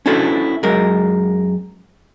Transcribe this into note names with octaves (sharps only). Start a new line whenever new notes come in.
C#4 D4 E4 F#4 A4 C5
F#2 G#3 A#4